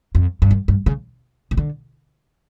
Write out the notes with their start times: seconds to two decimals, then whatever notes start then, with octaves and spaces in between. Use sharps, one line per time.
0.15 F2
0.42 G2
0.51 F#2
0.68 G2
0.86 C#3
1.51 C#3
1.57 D3